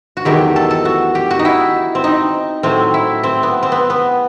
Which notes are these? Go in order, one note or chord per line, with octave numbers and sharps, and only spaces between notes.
F#4
E2 D#3 F#3 A3 G4
A4
A4
F#4
G4
F#4
D#4
E4
C4
D#4
A2 F#3 A3 C4
E4
C4
B3
C4
B3
B3